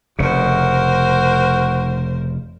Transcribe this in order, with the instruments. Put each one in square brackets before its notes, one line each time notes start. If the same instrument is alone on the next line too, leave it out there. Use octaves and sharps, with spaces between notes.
[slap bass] F1 C#3 [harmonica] F#4 [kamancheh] A#4 C5